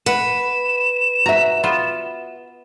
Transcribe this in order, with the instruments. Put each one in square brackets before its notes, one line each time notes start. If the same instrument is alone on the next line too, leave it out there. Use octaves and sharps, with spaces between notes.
[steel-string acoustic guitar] B4 [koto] F#5 [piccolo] E7
[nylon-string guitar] F#4 E5 [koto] A#5
[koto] B3 F4